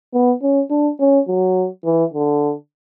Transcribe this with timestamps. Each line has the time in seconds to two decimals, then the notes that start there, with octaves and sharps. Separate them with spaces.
0.14 B3
0.42 C#4
0.71 D4
1.00 C#4
1.28 F#3
1.85 E3
2.13 D3